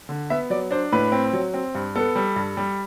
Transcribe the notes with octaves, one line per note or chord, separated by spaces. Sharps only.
D3
B3 E5
F#3 D5
D4 C5
A2 B4
C4
F#3
C4
G2
B3 A4
G3
G2
G3